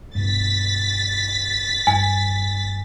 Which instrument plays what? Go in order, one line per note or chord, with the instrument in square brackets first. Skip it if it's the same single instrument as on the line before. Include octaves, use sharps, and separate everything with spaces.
[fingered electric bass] G2 B2 [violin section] A6 B6
[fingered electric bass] G2 [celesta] G#5